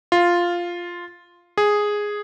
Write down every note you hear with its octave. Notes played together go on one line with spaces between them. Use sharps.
F4
G#4